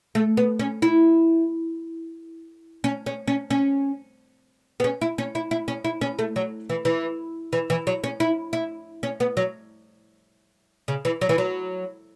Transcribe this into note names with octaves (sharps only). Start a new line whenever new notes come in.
A3
B3
C#4
E4
C#4
C#4
C#4
C#4
B3
C#4
E4
C#4
E4
E4
C#4
E4
C#4
A3
F#3
E3
E3
E3
E3
F#3
C#4
E4
E4
C#4
B3
F#3
C#3
E3
F#3
E3
F#3